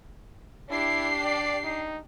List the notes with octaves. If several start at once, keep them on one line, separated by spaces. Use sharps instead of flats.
D4 E4 G4 C7
D5
D#4